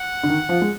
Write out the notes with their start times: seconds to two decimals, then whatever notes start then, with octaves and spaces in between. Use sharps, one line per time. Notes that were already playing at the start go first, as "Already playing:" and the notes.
Already playing: F#5
0.23 D3
0.29 D#3
0.49 F3
0.62 G#3